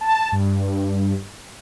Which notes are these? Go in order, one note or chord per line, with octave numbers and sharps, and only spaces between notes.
A5
G2